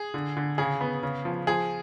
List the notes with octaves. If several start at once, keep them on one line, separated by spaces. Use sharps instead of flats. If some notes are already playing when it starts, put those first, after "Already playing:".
Already playing: G#4
D3
D3
C#3 G#4
B3
C#3
F3
F3 G#4